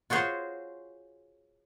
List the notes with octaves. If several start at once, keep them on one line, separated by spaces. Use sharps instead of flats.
F4 F#4 G#4 C5 C#5